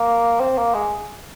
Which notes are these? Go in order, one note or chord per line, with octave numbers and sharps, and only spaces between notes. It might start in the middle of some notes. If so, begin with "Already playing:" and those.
Already playing: A#3
C4
A#3
G#3